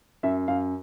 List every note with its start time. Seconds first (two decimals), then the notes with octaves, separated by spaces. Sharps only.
0.23 F#2 E5
0.48 F#2 F5